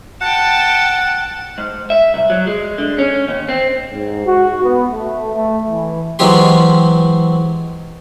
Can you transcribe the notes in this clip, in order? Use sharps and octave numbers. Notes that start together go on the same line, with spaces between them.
F#5 G5 A5
G#2
E5
C2
F#3
G#3
D3
C#4
D#2
C4
G#2
F#4
B3
A3
A3
E3
E3 F#3 G#3 C4 G4 C6